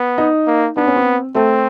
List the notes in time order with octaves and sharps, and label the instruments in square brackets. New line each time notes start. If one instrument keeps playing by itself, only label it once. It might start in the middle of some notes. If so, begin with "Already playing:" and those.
Already playing: [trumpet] B3
[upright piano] D#4
[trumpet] A#3
[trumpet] B3 [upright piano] D4
[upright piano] C#4
C4
[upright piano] A3 [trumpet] C4